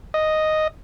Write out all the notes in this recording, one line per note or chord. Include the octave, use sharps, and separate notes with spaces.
D#5